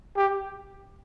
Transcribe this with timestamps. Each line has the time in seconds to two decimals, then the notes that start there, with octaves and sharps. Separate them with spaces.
0.17 G4